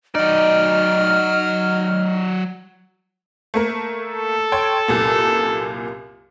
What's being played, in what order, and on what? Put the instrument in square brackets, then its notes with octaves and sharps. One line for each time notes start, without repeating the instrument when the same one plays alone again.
[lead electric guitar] F#3 D5 [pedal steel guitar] D#4 [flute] F6
[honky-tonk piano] A3 A#3 A#4
[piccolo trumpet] A4
[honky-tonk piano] C#5 G5 C6
C2 F#2 A#2